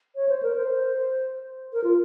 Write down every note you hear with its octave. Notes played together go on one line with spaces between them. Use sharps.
C#5
C5
A#4
C5
A#4
F4